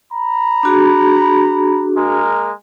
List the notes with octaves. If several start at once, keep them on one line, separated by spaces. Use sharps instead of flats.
A#5 B5
D4 F#4 G#4
G#3 A#3 A#4